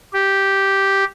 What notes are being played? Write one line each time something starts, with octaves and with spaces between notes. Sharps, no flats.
G4